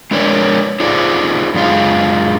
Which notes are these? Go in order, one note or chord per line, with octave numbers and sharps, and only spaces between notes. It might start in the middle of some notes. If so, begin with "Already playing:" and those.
G#3 D4 A#4 B4 C#5 D5
D#4 F4 G#4 A4 C5 D5
F#2 D3 G#3 F4 G#4